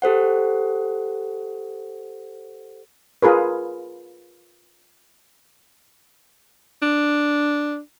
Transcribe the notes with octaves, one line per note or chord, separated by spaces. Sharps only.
G4 A4 C5 F#5
F4 G#4 A#4 B4
D4